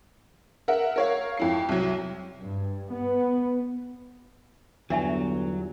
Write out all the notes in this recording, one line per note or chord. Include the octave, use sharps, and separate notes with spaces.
A#4 E5 F#5
A#4 C#5 F5
F2 E4 C7
C2 F#3
G2
B3
G1 E2 F#3 D4 E5 G#5